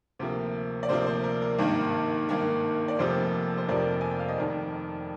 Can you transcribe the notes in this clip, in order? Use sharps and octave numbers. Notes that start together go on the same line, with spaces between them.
D2 C3 F3 A#3
D5
D2 C3 F3 A#3 C5
C5
A#4
A#4
G#1 G2 D#3 A#3
G#1 G2 D#3 A#3
D5
F1 F2 C3 F3 A#3 C5
C5
F1 F2 C3 F3 A#3 A#4 D5
G#5
G5
F5
D#5
F1 F2 D#3 A#4 D5